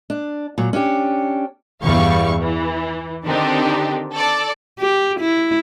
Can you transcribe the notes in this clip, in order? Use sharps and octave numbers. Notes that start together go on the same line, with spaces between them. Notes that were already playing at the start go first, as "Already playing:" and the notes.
D4
A#2 F#3
C#4 D4 F#4 G4
E2 G2 G3 E4 F5 C#6
E3
D3 D#3 C4 D4 D#4 G4
A4 D5
G4
E4